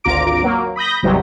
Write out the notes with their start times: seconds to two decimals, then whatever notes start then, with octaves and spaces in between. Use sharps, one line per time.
0.04 G#1 D2 F4 A#5 D6 D7
0.42 F#3 A#3
0.76 B5 D#6 G6 A#6
1.03 G#1 E2 C3 E3 F#3 G3